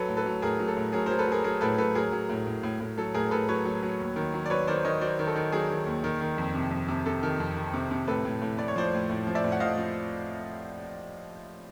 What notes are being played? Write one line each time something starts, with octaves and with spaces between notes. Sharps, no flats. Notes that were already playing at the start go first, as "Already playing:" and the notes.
Already playing: F#3 A4 B4
A2
A4 B4
F#3
A2 G#4 A#4
F#3
A4
A2
F#3 G#4 A#4
A#4 C5
F#3
A4 B4
F#3 G#4 A#4
F#3 G#4 A#4
A2 A4 B4
F#3 A4 B4
F#3 G#4 A#4
F#3
A2
A2
A2
A2
F#3 A4
A2 G#4 A#4
A2 A4 B4
F#3 B4 C#5
F#3
F#3
D#2
D#3
F#3
D5
F#3 B4 C#5
D#3 C5 D5
D#3 C#5 D#5
F#3 C5 D5
D#3
A4
D#3
F#3 G#4
D#3
D#2
D#3
D#3
F2
C3
F2
C3
C3 A4
D#3
F2
D#3
C3
C3
A2 A4 B4
A2
A2
A2 D5
C#5
F3 C5 D5
A2
A2
F3
D5 E5
A2
F#5
F3 D#5 F5
F3